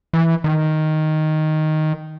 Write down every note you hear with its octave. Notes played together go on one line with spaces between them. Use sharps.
E3
D#3